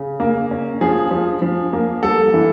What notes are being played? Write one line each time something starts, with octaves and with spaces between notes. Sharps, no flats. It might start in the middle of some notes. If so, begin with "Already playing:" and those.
Already playing: C#3 C#4
A#3
C#4
F3 G#4
F3
F3
A#3
G3 A4
E3